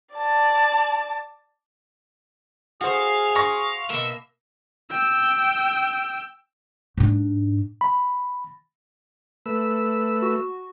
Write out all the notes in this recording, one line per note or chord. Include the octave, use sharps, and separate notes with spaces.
D5 A5
F#4 G#4 C5 F5
F5 C6 C#6 A#6
B2 A#3 E5
G5 E6
G#2 D4
B5
A3 B4 E6
F#4